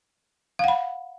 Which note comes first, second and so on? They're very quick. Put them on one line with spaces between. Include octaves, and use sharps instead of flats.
F5 F#5 B5